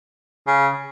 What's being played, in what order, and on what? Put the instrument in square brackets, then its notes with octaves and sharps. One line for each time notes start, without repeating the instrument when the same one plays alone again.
[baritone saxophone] C#3